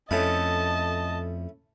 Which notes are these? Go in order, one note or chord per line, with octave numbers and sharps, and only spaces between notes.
F2 A3 C#4 E4 D#5 A5